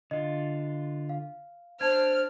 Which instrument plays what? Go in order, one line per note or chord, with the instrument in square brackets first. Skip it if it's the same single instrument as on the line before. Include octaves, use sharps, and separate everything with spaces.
[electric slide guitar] D3 F4 [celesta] D#5
[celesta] F5
[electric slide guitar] D4 [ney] C5 [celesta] A5 G#6 [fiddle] F6